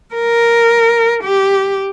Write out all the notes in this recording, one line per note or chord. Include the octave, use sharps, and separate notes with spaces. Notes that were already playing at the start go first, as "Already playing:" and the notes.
A#4
G4